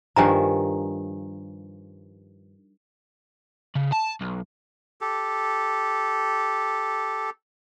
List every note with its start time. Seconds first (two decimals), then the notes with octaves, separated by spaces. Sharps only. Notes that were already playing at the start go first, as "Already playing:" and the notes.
0.16 G2 D#3 F3 G4 G#5 A#5
3.76 C#3
3.93 A5
4.21 B1
5.01 G4 A4